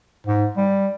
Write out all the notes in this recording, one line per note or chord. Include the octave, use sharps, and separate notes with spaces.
G#2
G3